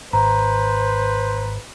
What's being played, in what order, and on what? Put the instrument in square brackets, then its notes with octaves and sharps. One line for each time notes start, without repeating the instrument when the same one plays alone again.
[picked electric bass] G#1 [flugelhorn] B4 [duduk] C5 [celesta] A#5